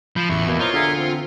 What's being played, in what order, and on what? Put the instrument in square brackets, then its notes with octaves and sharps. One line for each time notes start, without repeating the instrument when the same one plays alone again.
[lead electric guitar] F3 [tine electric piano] B5 G6
[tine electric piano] A1 E4 [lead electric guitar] E2 [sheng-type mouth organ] C#6
[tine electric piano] B2 A#3 E4
[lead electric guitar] F4 [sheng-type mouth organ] A#4 C5 D#5 [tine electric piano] C#5 C#6
[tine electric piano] D3 C#7 [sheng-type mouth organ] G#4 A#4 E5
[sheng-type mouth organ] C4